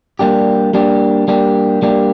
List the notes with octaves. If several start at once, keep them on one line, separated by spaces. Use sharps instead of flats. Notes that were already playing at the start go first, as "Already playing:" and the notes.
G3 A#3 D4 G4
G3 A#3 D4 G4
G3 A#3 D4 G4
G3 A#3 D4 G4